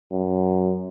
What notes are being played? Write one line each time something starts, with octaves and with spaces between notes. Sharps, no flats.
F#2